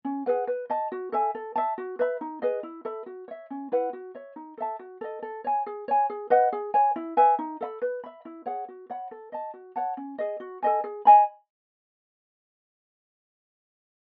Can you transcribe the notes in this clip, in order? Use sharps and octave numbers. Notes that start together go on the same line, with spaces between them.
C#4
G#4 B4 F#5
B4
D#5 A5
F#4
A4 E5 G#5
A4
E5 A5
F#4
B4 E5 B5
D#4
G#4 B4 D#5
E4
A4 E5 B5
F#4
C#5 E5
C#4
E4 B4 F#5
F#4
C#5 E5
D#4
A4 E5 A5
F#4
A4 D#5
A4
C#5 G#5
G#4
C#5 G#5
G#4
B4 D#5 F#5
G#4
C#5 G#5
E4
B4 E5 G#5
D#4
A4 E5 B5
B4
E5 B5
E4
G#4 C#5 F#5
F#4
C#5 F#5 B5
A4
D#5 A5
F#4
C#5 F#5 A5
C#4
G#4 D#5
F#4
A4 D#5 G#5
G#4
D#5 G#5 B5